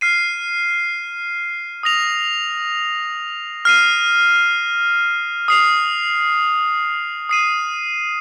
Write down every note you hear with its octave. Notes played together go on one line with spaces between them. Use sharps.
F6 C7 D#7
D#6 A#6 F7
F6 C7 D#7
D#6 C7 F7
D#6 C7 D#7